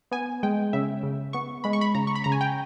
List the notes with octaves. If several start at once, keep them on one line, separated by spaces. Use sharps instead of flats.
B3 G#5
G#3 G5
C#3 E5
C#3
B3 C#6
G#3 B5
C#6
B5
C#3 A#5
C#6
B5
C#3 A#5
G#5
G5